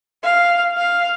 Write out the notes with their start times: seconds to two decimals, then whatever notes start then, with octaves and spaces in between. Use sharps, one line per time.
0.23 F5
0.76 F5